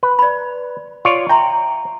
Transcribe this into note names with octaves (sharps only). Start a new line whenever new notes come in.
B4
D5 B5
F4 C#5 D5
E5 G5 A#5 C6